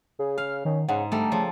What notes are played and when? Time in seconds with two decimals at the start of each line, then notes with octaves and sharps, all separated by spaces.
0.19 C#3 G#4
0.38 F5 F6
0.65 D#3 C#4
0.89 G#2 C#3 F#5
1.12 D3 G3 A3 A4 A#4
1.32 C#3 F3